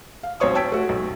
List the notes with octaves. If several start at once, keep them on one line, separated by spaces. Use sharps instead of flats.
F5
B1 C4 C5 C#5 C#6 D#6
G5 A5 E6 G#6 B6 D7
A3 F#4
B1